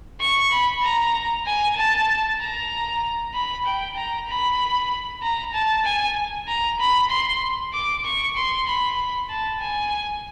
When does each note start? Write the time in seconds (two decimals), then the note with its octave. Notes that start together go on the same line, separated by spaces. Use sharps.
0.20 C#6
0.51 B5
0.83 A#5
1.46 G#5
1.76 A5
2.40 A#5
3.34 B5
3.66 G5
3.97 A#5
4.28 B5
5.22 A#5
5.53 A5
5.85 G#5
6.47 A#5
6.79 B5
7.10 C6
7.73 D6
8.04 C#6
8.36 C6
8.67 B5
9.29 A5
9.61 G#5